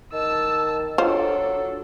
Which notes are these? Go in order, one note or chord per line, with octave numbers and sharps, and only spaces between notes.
D#3 A5 E6
F#3 D4 F4 A4 C5